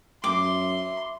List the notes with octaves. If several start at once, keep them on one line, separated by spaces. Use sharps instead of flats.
F#2 E5 C6 D6